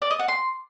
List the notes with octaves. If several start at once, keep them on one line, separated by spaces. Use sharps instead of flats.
D5
D#5
F#5
C6